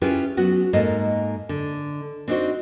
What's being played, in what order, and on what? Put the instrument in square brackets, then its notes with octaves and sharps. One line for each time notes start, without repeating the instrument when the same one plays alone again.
[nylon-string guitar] C#4 E4 F4 G4 G#4 B4
F#3 B3 F#4
G#2 A#3 A4 D#5
D3
C4 D4 D#4 F4 F#4 C5